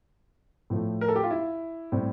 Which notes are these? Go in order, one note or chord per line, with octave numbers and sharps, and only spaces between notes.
A2 F3 A3
A#4
A4
G4
F4
E4
A2 G3 C4